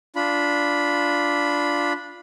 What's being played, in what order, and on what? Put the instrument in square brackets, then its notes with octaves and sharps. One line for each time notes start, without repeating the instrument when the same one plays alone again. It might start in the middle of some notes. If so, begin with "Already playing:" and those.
[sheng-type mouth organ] D4 F4 B5